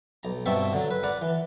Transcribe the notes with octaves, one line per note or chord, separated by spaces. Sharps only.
B1 A#5
G2 B2 C4 E5 A5 C#6
D3 F#3
B4
B4 D5 F#5 A#5
E3